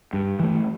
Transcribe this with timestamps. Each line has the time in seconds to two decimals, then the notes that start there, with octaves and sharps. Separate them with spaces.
0.13 G2
0.39 E3 A3